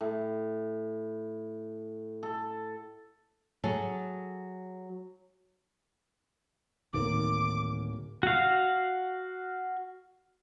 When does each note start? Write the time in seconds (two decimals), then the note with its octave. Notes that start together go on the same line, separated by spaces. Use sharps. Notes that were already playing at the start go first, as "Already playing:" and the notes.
0.01 A2
2.23 A4
3.64 F#3 G#4 A4
6.93 D1 D#3 A#3 D#4 D6
8.23 F#4 F5